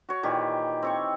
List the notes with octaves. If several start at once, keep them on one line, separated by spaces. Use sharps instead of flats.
F#4 C#5
A#2 D#3 E3 G4
C4 C#5 C#6